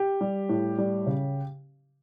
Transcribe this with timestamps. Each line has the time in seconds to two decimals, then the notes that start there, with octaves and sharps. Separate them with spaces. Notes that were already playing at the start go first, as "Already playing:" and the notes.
Already playing: G4
0.21 G3
0.49 A2
0.78 G3
1.06 C#3